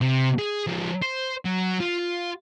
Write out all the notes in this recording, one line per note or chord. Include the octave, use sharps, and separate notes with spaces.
C3
G#4
F3 G#3
C5
F#3
F4